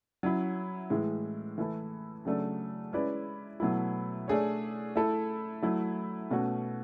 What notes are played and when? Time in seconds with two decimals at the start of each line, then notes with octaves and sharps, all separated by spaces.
0.23 F#3 C#4 E4
0.90 A2 E3 G#3
1.58 E3 A3 E4 A4
2.25 C#3 F#3 A3 D4 A4
2.93 G#3 C#4 E4 B4 D5
3.60 B2 F#3 A3 E4
4.28 A3 D4 G#4 C#5
4.96 A3 E4 A4
5.62 F#3 A3 E4
6.31 B2 A3 C#4 F#4